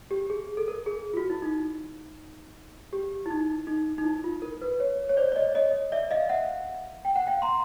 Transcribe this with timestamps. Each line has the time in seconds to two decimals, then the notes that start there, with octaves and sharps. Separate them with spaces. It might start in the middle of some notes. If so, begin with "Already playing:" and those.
0.11 G4
0.30 G#4
0.57 A4
0.68 A#4
0.86 G#4
1.13 F4
1.17 F#4
1.30 E4
1.42 D#4
2.93 G4
3.26 E4
3.30 D#4
3.67 D#4
3.98 D#4
4.04 E4
4.24 F4
4.42 A#4
4.61 B4
4.80 C#5
5.09 C#5
5.17 C5 D5
5.32 D5
5.36 C#5 D#5
5.55 C#5 D#5
5.92 D5 E5
6.11 D#5 F5
6.29 E5 F#5
7.05 G5
7.16 F#5
7.27 F5 G5
7.42 A#5 C6